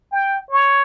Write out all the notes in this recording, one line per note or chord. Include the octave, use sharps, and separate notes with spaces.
G5
C#5